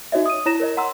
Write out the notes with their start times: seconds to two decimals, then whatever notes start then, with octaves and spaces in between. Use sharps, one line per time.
0.12 D#4 F#4 C#5 D#5 E5
0.26 D#6 D#7
0.46 E4 C#5 A#5 A#6 E7
0.60 A#4 C#5 D#5
0.77 F#5 A#5 C6 E6